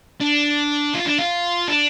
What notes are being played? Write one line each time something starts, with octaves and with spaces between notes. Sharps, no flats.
D4
F4
D4
F4
D4